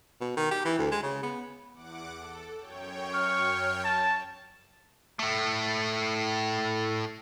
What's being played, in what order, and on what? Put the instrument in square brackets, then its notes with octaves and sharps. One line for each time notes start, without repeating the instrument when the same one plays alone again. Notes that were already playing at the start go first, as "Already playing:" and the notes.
[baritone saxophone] B2
D#3
G4
E3
D2
G#3
C#3
B3
[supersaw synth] E2 F#5 D6
A4
F#2 C#5 G5
[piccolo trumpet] C#6 [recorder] F6
[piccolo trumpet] A5
[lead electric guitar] A2 A3